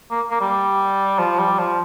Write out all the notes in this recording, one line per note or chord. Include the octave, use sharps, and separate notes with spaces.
A#3
A#3
G3
F3
G3
F3